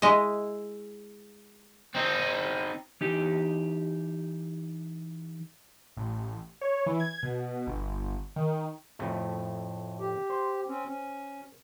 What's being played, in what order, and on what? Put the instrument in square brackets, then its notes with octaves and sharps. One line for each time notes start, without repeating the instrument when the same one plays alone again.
[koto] G#3 E4 D#5
[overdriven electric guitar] C4 D#4
[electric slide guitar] E3 D#4 G4
[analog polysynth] A1
C#5
E3
G#6
B2
G1
D#3
[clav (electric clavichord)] F2 A2 A3
[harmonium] G4
[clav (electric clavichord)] C5
[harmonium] C4 C#4
C#4